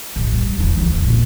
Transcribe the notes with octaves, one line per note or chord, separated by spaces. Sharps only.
A1
G3
F2 E3
D2
C#3
A#2